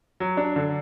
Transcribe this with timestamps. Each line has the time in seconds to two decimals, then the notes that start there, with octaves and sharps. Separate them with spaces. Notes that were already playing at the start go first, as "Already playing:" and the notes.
0.20 F#3
0.37 D4
0.56 D3